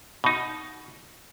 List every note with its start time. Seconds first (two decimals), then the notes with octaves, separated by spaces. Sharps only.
0.24 B2 D#4